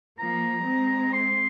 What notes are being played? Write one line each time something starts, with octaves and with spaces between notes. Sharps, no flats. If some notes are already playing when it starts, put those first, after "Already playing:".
F3 A#3 A#5
G#3 C4
C6